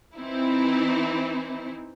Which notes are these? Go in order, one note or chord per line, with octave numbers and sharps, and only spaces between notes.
E3 C4 D#4 E4